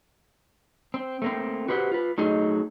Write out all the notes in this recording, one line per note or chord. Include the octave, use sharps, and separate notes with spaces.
C4
A3 A#3 C4
F#4 G4 B4 C5 E5 F#5
F4 B4
F#3 A3 D#4 G#4 D#5